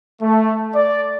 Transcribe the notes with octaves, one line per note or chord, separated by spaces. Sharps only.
A3
D5